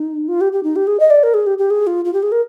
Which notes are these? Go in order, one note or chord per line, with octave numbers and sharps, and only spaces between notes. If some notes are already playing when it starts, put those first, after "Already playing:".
Already playing: D#4
F4
G4
G4
D#4
G4
G#4
D#5
D5
A#4
G#4
G4
G4
G#4
F4
F4
G4
G#4
A#4